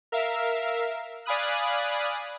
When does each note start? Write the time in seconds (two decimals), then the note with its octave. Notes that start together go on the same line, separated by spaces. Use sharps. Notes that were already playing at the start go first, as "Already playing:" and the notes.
0.12 A#4 E5 F5
1.26 D5 F5 G#5 B5 D#6 F#6